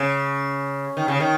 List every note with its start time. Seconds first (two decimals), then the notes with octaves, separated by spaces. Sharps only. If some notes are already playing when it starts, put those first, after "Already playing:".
Already playing: C#3
0.97 D#3
1.08 C#3
1.20 D#3